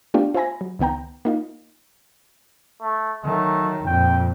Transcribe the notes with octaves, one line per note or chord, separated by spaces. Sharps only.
A3 B3 D4 F4 G4
F4 C5 E5 G#5 B5 A#6
F#3
C#2 D#3 B3 G5 A#5
A#3 D#4 F4
A3
D#3 F#3 A3
F2 A#2 G5